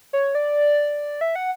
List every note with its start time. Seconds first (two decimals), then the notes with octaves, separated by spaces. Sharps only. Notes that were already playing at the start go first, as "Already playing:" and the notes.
0.13 C#5
0.35 D5
1.21 E5
1.35 F#5